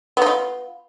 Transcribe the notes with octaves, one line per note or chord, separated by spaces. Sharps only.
B3 D#4 F4